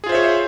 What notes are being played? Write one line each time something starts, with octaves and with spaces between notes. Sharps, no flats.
F4 G#4 C5 C#5 E5